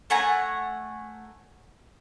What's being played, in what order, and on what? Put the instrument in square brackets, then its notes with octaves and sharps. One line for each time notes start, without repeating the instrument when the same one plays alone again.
[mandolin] A3 F#5 G#5 A#5